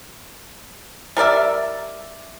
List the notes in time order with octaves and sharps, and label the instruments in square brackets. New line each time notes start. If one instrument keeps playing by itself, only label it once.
[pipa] G3 A#4 D5 E5